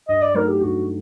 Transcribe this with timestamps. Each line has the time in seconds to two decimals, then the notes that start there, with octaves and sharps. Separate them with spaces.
0.08 G2 D#5
0.22 D5
0.34 F#3 A3 D#4 A#4
0.48 G4
0.61 G2 F#4